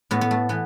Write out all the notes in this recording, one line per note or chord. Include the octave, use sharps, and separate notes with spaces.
A2 B3
B3
A3
E3 B3